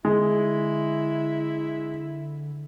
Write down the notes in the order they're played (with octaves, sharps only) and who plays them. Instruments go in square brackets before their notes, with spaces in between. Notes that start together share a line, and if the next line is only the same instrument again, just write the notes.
[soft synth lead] D3 [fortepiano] G#3 [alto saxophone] E4